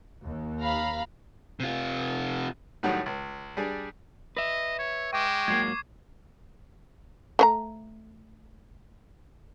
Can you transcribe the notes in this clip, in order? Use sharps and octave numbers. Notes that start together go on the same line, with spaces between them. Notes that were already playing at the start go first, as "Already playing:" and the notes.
D#2
F5 A#5 B5
C3 F4
A2 D#3 F#3 G3 F#4
C#2
G3 D4 G#4
B4 D#5 E5
C#5
G#3 G5 C#6 D6
G#2 F#3 A#3 G#6 C7
A3 C5 A#5